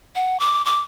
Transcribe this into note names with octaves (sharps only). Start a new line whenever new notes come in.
F#5
D6
D6